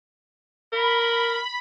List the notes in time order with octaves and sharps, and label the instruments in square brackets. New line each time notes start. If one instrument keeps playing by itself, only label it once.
[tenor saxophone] A#4 [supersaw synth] B5